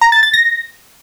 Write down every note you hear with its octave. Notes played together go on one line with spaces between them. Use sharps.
A#5
A6
A6
A#6